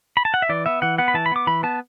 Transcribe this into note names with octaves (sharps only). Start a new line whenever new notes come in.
B5
A5
F#5
E5
E3 D5
B3 E5
E3 F#5
B3 F#5
B5
E3 A5
B5
B3 D6
E3 B5
B3 A5